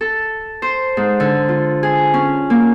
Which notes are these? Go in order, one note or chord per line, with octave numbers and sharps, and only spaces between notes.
A4
C5
G#2
D3
F4
G#4
C#4
A#3